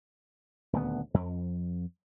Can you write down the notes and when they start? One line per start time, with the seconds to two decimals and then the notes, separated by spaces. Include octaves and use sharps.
0.73 D#1 D2 B3
1.14 F2